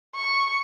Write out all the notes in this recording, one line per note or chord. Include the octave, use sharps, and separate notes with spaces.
C#6